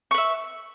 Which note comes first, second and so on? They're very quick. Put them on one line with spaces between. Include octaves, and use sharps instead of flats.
C#6 B4 E5